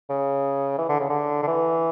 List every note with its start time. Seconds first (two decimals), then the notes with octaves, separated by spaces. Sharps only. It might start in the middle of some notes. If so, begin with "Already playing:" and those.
0.09 C#3
0.78 E3
0.89 D3
0.99 C#3
1.10 D3
1.43 D3
1.47 E3